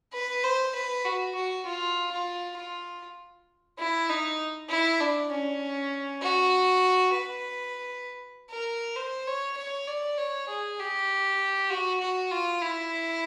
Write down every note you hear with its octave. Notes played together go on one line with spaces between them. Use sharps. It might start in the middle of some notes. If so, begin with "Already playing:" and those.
B4
C5
B4
F#4
F#4
F4
F4
F4
E4
D#4
E4
D4
C#4
F#4
B4
A#4
C5
C#5
C#5
D5
C#5
G#4
G4
F#4
F#4
F4
E4